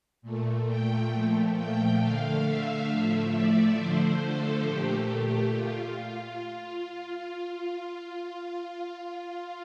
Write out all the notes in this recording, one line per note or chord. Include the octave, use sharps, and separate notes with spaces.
A#2 A3
G5
A#2 F3 A3
G5
D3 A3 F5
E5
A2 F3 A3 E5
D5
D3 F3 A3 C5
A4
A#2 A3 G4
F4